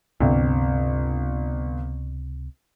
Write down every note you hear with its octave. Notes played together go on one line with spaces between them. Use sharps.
G1 C#2 C3 C4